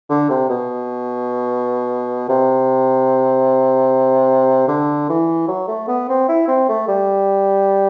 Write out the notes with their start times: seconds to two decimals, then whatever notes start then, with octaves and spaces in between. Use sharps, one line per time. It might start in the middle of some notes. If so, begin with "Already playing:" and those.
0.09 D3
0.29 C3
0.49 B2
2.29 C3
4.68 D3
5.09 E3
5.48 F#3
5.68 A3
5.88 B3
6.09 C4
6.28 E4
6.48 C4
6.69 A3
6.88 G3